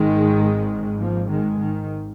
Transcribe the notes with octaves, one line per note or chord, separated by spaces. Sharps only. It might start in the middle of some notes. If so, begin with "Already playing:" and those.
Already playing: G#1 G#2 D#3 G#3
F3 A#3
D#3 G#3
D#3